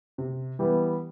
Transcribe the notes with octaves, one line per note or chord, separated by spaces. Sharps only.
C3
E3 G3 B3